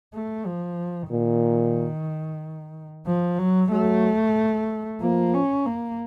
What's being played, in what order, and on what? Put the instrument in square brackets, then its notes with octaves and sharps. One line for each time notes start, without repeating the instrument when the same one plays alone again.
[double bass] A3
F3
[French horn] A#2 [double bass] D#3
[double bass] F3
F#3
[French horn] F#3 [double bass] A3
[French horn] F3 [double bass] A#3
[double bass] C#4
A#3